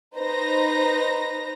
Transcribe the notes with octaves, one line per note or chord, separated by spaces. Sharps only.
D#4 B4 C5 A#5 A#6